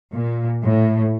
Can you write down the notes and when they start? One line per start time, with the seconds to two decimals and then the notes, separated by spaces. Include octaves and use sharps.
0.13 A#2
0.63 A2